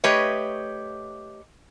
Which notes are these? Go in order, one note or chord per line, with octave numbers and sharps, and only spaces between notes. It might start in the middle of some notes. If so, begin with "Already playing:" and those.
A3 G4 B4 C#5 D#5